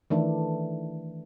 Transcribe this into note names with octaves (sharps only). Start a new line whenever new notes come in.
D#3 E3 A3 D4